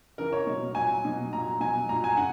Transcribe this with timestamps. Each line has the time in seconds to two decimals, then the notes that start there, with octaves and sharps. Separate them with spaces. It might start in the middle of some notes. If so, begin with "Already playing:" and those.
0.18 C#3 E3 A#4
0.33 C#5
0.47 B2 F#3
0.75 A#2 F#3 G#5
1.04 B2 F#3
1.33 A#2 F#3 A#5
1.60 B2 F#3 G#5
1.89 A#2 F#3 A#5
2.04 G#5
2.17 C#3 F#5